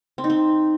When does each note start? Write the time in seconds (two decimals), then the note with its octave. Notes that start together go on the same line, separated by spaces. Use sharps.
0.18 C4
0.24 D#4
0.30 C4